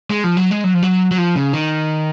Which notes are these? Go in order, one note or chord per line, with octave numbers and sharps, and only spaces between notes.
G#3
F3
F#3
G#3
F#3
F3
F#3
F#3
F3
C#3
D#3